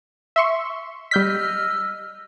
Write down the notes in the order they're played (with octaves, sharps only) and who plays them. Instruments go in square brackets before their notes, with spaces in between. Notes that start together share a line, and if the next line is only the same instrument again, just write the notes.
[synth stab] E5 C6 C#6
[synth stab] G3 G6 B6 [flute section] D#5 E6 F6